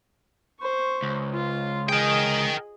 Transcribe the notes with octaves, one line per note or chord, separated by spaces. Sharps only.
C5 C#6
C#2
F4 C6
G#4 A#4 D#5 G5